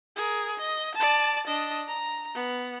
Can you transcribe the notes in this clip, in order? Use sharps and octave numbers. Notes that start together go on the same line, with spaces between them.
G#4 A#4
D#5
D5 A5
D4 D#5
A#5
B3